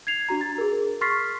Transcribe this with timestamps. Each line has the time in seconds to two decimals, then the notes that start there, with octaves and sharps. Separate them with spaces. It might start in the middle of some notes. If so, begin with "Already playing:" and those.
0.07 G#6 C7 F7
0.29 D4 F#4 A#5
0.41 A6
0.58 G#4 A#4
1.01 C6 C#6 F6 A6 B6 C7